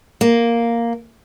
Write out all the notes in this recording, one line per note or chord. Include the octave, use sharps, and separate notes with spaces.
A#3